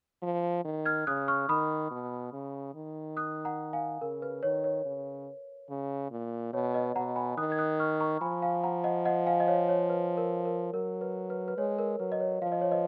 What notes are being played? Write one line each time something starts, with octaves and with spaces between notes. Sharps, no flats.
F3
D#3
F6 G#6
C#3 D#6 F#6
C#6 F6
D#3 B5 D#6
B2
C#3
D#3
D#6 F#6
F#5 A#5
F5 G#5
C#3 A#4
B4
D#3 C#5
C#5
C#3
C#3
A#2
B2 C#5
B4 D#5
B2 F#5 A#5
G#5 B5
D#3 D#6 F#6
G#6
D#6 F#6
C#6 F6
A#5 C#6
F3 G#5 B5
F5 G#5
F#5 A#5
D#5 F#5
D#5 F#5
F5 G#5
D#5
C#5 F5
C#5
B4
A#4
A#4
F#3 A#4
B4
B4
B4
G#3 C#5
A#4
F#3 B4
D#5
C#5
F3 F5
D#5
C#5
B4 D#5